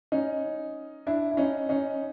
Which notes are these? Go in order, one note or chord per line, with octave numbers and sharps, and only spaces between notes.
C#4 D#4
D4 E4
E4
C#4 D#4
C#4 D#4